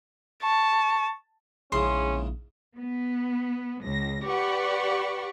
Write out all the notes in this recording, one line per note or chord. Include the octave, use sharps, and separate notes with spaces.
A5 C#6
A#1 E2 G#2 C#3 C#4 C6
B3
C#2 A#6
G4 B4 D5 F#5 C#6